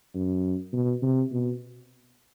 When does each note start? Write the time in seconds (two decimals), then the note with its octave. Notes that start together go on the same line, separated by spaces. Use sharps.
0.15 F#2
0.73 B2
1.02 C3
1.32 B2